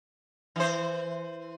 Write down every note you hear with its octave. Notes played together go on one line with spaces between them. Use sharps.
E3 C5